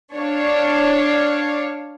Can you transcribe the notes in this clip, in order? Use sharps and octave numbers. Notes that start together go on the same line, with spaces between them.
D4 C#5 F5